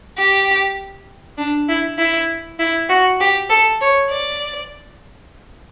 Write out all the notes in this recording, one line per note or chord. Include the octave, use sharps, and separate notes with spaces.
G4
D4
E4
E4
E4
F#4
G4
A4
C#5
D5